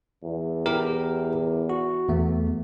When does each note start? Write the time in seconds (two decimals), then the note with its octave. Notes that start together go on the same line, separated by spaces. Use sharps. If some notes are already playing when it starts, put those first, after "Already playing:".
0.24 E2
0.66 E4 G4 A#4
1.70 F#4
2.09 E2 A3